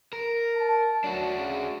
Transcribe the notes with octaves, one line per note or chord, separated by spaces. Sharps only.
A#4
A5
F#3 D4 F#4
C#3